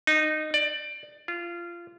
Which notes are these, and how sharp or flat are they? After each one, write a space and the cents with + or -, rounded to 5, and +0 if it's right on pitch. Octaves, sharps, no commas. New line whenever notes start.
D#4 -15
D5 +15
F4 -20